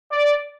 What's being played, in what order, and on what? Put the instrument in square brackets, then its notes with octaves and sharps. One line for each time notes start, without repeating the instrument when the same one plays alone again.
[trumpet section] D5